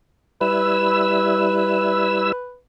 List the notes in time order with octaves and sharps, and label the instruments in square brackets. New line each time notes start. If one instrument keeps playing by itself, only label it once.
[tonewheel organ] G3 E4 E6 [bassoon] B4